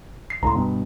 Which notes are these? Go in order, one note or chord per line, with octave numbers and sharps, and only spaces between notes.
C7
C#2 A2 A#5 C6
G2 B2